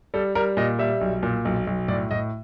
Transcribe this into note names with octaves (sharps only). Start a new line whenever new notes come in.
G3 A4
G3 A#4
A#2 D#5
G3 E5
B1
A#2
B1
B1
A2 D5
A2 D#5